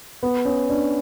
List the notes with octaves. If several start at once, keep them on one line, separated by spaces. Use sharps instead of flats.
B3
C#4
D4